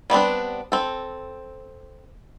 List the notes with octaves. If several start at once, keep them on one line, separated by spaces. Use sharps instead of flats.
G3 B3 C4 D4
C4 A4